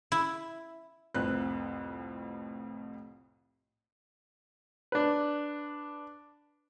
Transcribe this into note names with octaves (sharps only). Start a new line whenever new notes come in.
E4
C2 F2 A2 C4 B4 F#6
D4 B4